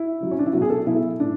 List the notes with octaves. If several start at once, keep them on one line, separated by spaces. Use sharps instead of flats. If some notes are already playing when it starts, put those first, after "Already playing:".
Already playing: E4
C#3 F#3
C#4
D4
E4
B2 F#3 F#4
G#4
A4
B2 F#3 E4
A2 D4